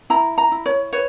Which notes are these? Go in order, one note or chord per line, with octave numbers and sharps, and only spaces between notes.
E4 A#5
A#5
E4
C#5
B4 C#5